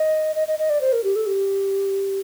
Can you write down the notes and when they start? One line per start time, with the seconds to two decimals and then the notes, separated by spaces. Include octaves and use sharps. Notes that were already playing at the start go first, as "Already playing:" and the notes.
Already playing: D#5
0.36 D#5
0.48 D#5
0.59 D#5
0.70 D5
0.81 C5
0.93 A#4
1.04 G4
1.16 A4
1.27 G4